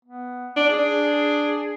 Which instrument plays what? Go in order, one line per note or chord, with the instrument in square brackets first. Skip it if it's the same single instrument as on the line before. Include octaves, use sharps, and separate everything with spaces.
[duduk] B3
[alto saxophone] D4
[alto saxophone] D4 [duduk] G#4
[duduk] G#4